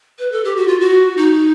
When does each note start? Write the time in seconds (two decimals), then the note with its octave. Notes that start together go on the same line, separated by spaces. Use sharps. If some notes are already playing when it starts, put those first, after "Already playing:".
0.19 B4
0.32 A4
0.45 G4
0.56 F#4
0.68 F4
0.80 F#4
1.17 D#4